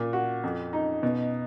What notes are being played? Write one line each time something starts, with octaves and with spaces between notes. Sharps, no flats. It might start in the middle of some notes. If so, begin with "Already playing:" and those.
Already playing: A#2
F#4
F2
D#4
B2